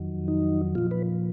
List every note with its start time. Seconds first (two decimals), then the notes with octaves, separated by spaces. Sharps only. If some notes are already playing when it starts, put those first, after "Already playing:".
Already playing: F2 D#3 F#3
0.28 D#4
0.75 A#2 F3 F4
0.91 B4